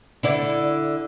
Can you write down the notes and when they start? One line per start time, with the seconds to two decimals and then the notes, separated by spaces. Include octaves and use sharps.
0.23 D3 E4 D5